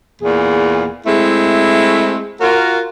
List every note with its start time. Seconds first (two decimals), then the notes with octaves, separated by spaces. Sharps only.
0.22 E2 A#2 G#4
1.06 G#3 A3 C4 E4
2.41 F4 F#4 A#4